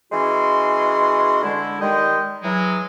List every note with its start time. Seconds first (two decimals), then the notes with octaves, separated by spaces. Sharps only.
0.11 E3 G#3 C#4 F#4 C6
1.43 D3 G#3 E4
1.80 D#3 G3 G#3 D#5 G5
2.43 E3 F#3 G#3